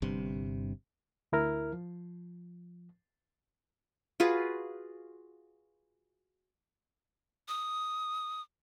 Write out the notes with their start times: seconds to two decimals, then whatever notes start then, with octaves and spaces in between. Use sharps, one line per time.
0.02 G1 G2 C3
1.32 D2 E4 A#4 F6
1.73 F3
4.20 F4 F#4 G#4 B4
7.48 D#6